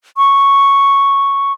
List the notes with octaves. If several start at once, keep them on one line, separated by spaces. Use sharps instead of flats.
C#6